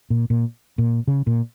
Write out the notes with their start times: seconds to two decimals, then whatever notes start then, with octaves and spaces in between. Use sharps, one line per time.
0.10 A#2
0.30 A#2
0.78 A#2
1.07 C#3
1.27 A#2